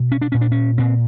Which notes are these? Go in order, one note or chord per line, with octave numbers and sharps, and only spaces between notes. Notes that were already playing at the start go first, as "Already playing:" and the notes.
Already playing: B2
C#4
D4
A#2 C#4
D4
C#4
A#2 C4